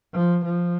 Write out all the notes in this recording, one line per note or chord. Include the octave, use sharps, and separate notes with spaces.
F3
F3